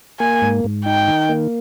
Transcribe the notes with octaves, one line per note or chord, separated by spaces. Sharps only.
A#3 G#5
G#2
G#2
D#4 G5
D#3
A#3